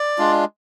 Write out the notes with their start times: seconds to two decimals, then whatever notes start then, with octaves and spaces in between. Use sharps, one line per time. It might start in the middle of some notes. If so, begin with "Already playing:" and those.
Already playing: D5
0.18 G#3 D4 F4